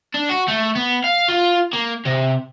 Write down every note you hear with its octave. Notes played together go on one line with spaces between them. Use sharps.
D4
F#4
A3
B3
F5
F4
A#3
C3